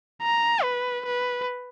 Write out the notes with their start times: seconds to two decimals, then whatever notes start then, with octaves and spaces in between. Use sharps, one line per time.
0.22 A#5
0.63 B4
1.06 B4